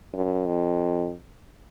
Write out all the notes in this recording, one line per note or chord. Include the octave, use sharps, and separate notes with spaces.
F#2
F2